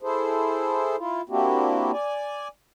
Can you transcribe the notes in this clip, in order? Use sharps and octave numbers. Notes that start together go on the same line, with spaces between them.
E4 G#4 A4 C5
E4 F4
A#3 C4 D4 E4 F#4 G4
D5 G#5